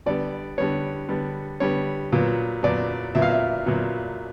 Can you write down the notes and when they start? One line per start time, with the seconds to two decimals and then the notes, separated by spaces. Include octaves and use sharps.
0.06 D3 G3 B3 D5
0.58 D3 G3 B3 C#5
1.09 D3 G3 B3
1.60 D3 G3 B3 C#5
2.12 A#2 F#3 B3
2.63 A#2 F#3 B3 D5
3.15 A#2 F#3 B3 E5
3.22 F5
3.31 E5
3.66 A#2 F#3 B3